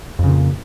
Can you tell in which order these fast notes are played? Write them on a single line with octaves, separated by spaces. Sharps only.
F2 C#3 A#2